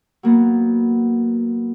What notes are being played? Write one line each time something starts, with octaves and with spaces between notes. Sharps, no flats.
F#3 A#3 B3